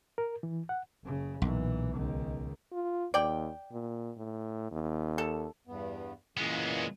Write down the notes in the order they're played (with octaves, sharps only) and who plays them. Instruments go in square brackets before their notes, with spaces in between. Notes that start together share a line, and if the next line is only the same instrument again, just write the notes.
[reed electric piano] A#4
E3
F#5
[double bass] F#1 C#3
[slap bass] B1 [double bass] A#2 E3
[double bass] C#2 D#3
[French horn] F4
[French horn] D#2 [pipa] D5 G5
[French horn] A#2
A2
D#2
[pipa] A4
[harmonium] E2 G2 B3
[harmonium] A#2 C#3 E3 [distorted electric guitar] G#3 B3